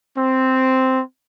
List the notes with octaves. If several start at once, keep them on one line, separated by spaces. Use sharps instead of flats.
C4